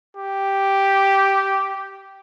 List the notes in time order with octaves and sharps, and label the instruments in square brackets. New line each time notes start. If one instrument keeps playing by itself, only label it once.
[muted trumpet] G4